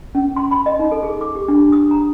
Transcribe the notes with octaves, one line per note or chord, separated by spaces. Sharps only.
C#4
C6
B5
D#5
D#4
A4
G#4
D6
G4
D4
D#6
A#5